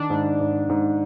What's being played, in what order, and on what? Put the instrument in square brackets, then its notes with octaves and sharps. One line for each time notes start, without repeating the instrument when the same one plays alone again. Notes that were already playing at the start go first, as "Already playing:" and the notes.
Already playing: [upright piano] D#3 [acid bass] D4
[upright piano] G#2
G#2
G#2